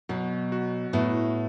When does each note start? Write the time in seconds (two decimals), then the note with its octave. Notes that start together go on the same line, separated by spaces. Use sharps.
0.09 B2 F#3
0.52 F#4
0.93 A2 B3